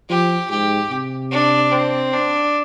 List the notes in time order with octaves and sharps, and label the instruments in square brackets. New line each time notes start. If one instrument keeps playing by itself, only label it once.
[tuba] F3 [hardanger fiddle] G4
[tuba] G#2 [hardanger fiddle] G4
[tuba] C3
[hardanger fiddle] D4
C4
D4